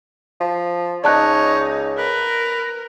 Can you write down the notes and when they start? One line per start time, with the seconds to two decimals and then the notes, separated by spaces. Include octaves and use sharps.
0.40 F3
1.04 C#2 D#4 C#5 D5 A5 F#6
1.98 A#4 B4